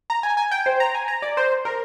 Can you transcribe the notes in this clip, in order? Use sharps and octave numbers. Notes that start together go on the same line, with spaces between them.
A#5
G#5
G#5
G5
C5
A#5
G#5
A#5
D5
C5
A#4